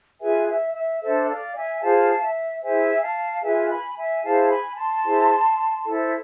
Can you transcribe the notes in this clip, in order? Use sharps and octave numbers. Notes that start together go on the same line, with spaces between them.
F4 G#4 B4 E5 G#5
E5
E5
D4 A4 C5 E5
D5 F5
E5 G#5
F4 G#4 C5 F5 A5
E5
E4 G#4 C5 E5 G#5
F5 A5
F4 G#4 B4 E5 G#5
G#5 B5
E5 G#5
E4 G#4 C5 F5 A5
G#5 B5
A5 C6
E4 G#4 C5
E4 A4 C5